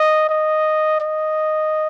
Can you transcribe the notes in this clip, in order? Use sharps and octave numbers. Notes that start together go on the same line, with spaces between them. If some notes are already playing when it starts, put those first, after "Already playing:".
Already playing: D#5
D#5
D#5